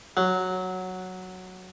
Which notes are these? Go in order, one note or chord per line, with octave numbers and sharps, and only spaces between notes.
F#3